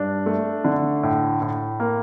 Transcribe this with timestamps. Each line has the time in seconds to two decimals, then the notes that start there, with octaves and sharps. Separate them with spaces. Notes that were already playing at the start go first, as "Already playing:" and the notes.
Already playing: G2 D4
0.26 A3
0.65 D3
1.03 A2
1.42 A2
1.80 A#3